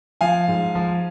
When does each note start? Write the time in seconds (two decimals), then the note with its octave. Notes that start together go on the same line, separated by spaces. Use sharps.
0.21 F3 F5 G#5
0.48 G#2
0.75 F3